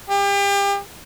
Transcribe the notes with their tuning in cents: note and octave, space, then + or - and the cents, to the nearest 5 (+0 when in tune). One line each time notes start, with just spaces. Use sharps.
G4 +35